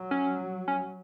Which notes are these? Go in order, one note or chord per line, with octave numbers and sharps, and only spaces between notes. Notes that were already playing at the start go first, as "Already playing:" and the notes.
Already playing: F#3
C#4
C#4